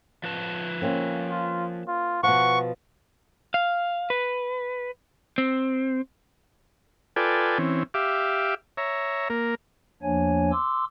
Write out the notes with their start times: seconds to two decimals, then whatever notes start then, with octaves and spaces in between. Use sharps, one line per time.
0.23 F3 B4 A5
0.82 A#3 C4 C#4
1.30 F4
1.88 F4
2.23 B2 F3 F#5 C#6
3.54 F5
4.10 B4
5.38 C4
7.16 F4 A4 B4 D5 G5 G#5
7.58 E3 C4 C#4
7.94 G4 E5 F5 D6
8.77 C#5 E5 A#5
9.30 A#3 A#4
10.03 E2 F3 A#3 D4 C#5 G#5
10.52 C6 D6 E6